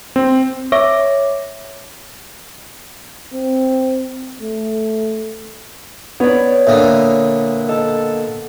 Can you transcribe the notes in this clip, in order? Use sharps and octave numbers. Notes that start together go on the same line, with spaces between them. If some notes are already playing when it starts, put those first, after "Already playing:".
C4
C#5 E5 D6 A#6
C4
A3
B3 C#5 D5
A#2 D3 E5 D#6
A4 D#5